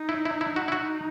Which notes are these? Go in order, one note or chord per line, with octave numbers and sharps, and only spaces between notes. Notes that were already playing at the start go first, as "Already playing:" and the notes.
Already playing: D#4
E4
E4
E4
F#4
E4
D#4 F#4